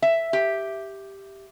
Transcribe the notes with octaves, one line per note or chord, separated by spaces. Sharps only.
E5
G4